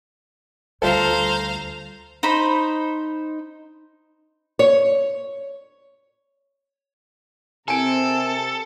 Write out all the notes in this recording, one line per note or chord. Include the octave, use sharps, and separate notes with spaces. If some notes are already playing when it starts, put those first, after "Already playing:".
D2 G3 F4 A4 C5 F5 A#5
D#4 C5 B5
C#5
C3 C4 A4 A#4 G#5 D7